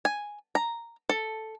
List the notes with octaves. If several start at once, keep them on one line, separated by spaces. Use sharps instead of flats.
G#5
A#5
A4